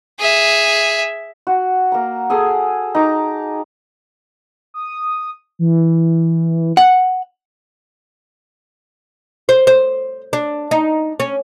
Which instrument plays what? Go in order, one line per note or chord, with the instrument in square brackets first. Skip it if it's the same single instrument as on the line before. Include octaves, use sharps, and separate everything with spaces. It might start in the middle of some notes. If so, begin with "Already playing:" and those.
[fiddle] G#4 E5
[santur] F#4
A#3 A#5
G#4 A4 G#5 D#6
D#4 A#5 D6
[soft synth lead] D#6
E3
[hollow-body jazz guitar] F#5
[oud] C5
C5
D4
D#4
C#4